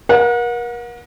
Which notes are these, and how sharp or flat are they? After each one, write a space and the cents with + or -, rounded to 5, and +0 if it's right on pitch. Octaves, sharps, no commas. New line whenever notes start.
A#4 +35 F#5 -35